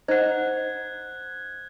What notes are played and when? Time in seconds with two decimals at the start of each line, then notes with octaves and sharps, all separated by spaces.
0.08 D#4 C5 F#5 F#6 G#6